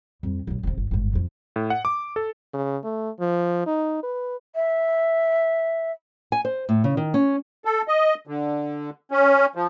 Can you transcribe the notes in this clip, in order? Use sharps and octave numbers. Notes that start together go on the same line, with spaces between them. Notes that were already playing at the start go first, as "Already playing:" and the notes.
F2 G3
B1 B2
F1 C3
G1
G1 G#2
F2 C3
A2
F#5
D6
A4
C#3
A3
F3
D#4
B4
E5
G#5
C5
A2
C#3
D#3
C#4
A4
D#5
D3
C#4
F3